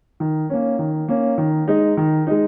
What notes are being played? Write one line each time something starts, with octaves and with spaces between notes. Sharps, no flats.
D#3
A#3 C#4
D#3
A#3 C#4
D#3
G#3 D#4
D#3
G#3 D#4